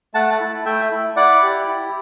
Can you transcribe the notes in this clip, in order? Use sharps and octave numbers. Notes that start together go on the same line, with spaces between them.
A3 F#5 A5
E4
A3 E5 G5
E4
E4 D5 F#5
G4
E4